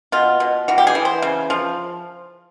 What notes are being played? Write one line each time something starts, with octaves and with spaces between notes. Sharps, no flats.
B2 F4
B2
E3 F#4
G4
G#4
E3
C5
C#3
F3